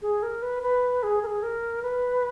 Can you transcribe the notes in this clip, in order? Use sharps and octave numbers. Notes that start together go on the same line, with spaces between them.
G#4
A#4
B4
B4
G#4
A#4
G#4
A#4
B4